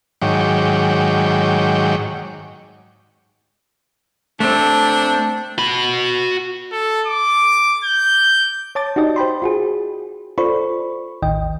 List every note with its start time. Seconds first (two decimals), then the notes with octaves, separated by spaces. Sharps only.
0.22 G#2 D#3 F#3 C#5 G5 D6
4.40 A3 C4 D4
5.58 F#4 B5
6.71 A4
7.07 D6
7.84 G6
8.75 C#5 A5 D6 A6
8.96 D#4 F#4 G4 D5 D#5
9.16 C5 G5 B5 C6
9.42 F4 F#4 G#4
10.38 F4 A4 C5 D5 B5 C#6
11.22 A1 D#2 D#3 D#5 G5